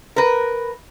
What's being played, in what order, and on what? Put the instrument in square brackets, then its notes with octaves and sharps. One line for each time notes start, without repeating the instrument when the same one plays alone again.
[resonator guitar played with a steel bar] A#4 B4